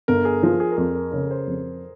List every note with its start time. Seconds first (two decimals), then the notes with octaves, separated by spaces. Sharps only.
0.08 G1 A#4
0.25 G#4
0.43 F3 A#4
0.60 G#4
0.72 A#4
0.77 F2 G#4
0.95 A#4
1.12 C#3 A#4
1.31 C5
1.47 F2